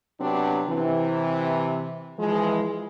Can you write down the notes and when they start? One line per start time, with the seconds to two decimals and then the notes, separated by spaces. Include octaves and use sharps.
0.20 C3 F#3 B3 C4 D4 G4
0.68 C3 E3
2.18 E3 F3 G#3